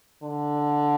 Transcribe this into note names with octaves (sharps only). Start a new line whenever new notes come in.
D3